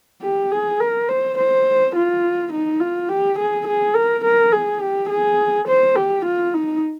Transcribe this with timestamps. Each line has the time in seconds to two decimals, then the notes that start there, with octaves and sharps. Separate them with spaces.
0.22 G4
0.51 G#4
0.80 A#4
1.09 C5
1.38 C5
1.95 F4
2.52 D#4
2.80 F4
3.09 G4
3.38 G#4
3.67 G#4
3.95 A#4
4.24 A#4
4.53 G#4
4.81 G4
5.10 G#4
5.68 C5
5.96 G4
6.25 F4
6.54 D#4